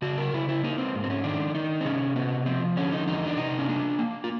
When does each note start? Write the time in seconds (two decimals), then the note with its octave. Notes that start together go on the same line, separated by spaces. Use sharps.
0.02 C#3 F#4
0.18 A#4
0.34 C#3 E4
0.49 E4
0.64 A#3 D#4
0.78 C4
0.94 G#2
1.04 C4
1.10 C#4
1.24 D#3 D4
1.55 D#3 D#4
1.81 C4
1.85 C3 C#4
2.16 C3 B3
2.46 F3 C4
2.77 D3 C#4
2.92 D#4
3.07 E2 D#4
3.27 D4
3.37 C3 D#4
3.59 C#4
3.68 A#3 D4
3.99 A#3
4.24 F4